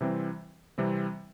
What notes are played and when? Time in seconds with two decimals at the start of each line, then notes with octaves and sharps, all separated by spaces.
0.01 C3 E3 G3 C4
0.78 C3 E3 G3 C4